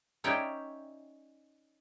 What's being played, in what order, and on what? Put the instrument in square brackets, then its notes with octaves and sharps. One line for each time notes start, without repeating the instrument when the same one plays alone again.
[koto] C#4 D#4 E4 C#5 D5 G5